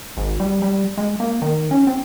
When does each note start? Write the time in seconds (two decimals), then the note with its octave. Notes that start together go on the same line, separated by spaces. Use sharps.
0.17 G#1
0.40 G3
0.62 G3
0.97 G#3
1.20 A#3
1.42 D#3
1.71 C#4
1.87 C4